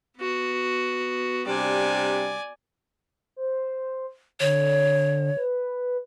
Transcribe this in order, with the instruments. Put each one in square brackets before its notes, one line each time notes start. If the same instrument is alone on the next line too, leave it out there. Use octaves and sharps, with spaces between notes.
[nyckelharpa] B3 F#4
[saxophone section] C3 G3 D4 [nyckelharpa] D5 G#5
[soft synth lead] C5
[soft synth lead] D3 [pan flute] C#5
[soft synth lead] B4